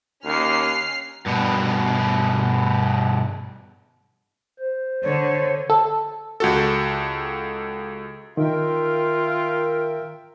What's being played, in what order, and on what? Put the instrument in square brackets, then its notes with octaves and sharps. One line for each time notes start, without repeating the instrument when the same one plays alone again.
[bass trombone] D#2 [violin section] C#4 F6 C7
[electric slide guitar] G2 B2
[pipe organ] C5
[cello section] D3 [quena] C#5
[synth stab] A4
[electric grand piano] C#2 F#4 A4
[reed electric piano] D#3 [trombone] F4 [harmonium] A#4 E5 G5